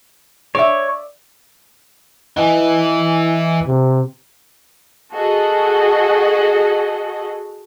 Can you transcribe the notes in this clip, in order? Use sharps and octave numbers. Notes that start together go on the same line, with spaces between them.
C#5 D5 E5
E3 D#5 F#5 G#5
C3
F#4 G#4 A4 D#5 F#5